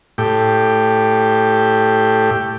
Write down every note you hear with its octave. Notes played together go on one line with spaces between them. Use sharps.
A2 G4